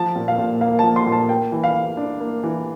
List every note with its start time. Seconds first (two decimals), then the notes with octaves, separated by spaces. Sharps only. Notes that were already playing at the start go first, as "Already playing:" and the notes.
Already playing: F3 A5
0.16 A#2
0.28 F5
0.38 A#2
0.61 A#3 F5
0.79 F3 A5
0.96 C6
1.06 A#2
1.12 A5
1.29 A#3 G5
1.52 E3
1.64 F5
1.75 E3
1.97 D4
2.20 A#3
2.43 E3